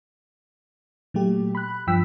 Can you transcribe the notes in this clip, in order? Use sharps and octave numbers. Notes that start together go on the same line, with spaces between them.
A#2 F#3 A3 G4
B5 F#6
G2 F3 G5 E6 B6